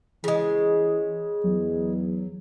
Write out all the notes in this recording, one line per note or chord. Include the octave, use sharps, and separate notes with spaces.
C#3 E3 G#3
E2 F#3